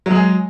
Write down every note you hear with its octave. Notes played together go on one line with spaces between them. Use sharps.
F#3 G#3 G#4